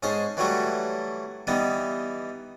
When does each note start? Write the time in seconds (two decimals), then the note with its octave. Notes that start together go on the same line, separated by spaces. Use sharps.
0.03 G#2 C#4 G#4 C5 A5
0.37 E3 F#3 G3 A3 F#4
1.47 E3 G3 B3 D#4